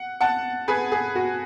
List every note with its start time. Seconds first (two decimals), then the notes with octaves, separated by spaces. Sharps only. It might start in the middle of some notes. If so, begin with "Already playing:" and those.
Already playing: F#5
0.21 F#5 A5
0.68 G#4 B4
0.92 G#4
1.15 F#4